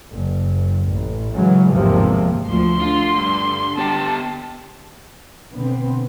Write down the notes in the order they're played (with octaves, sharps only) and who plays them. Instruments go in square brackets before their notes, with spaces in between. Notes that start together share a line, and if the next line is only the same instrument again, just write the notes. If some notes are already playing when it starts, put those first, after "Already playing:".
[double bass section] F#1
A1
C#3 E3 F#3 G#3
G#1 E2 G#2 C3 F3 A#3
[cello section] D2 F3 [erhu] C6
[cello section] D3 [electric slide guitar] F4
[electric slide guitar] G2
[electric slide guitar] B3 G4 G5 [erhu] A5
[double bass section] B2 D3 B3 C4